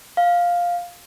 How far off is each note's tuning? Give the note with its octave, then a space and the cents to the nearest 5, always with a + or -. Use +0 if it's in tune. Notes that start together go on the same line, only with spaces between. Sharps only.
F5 +5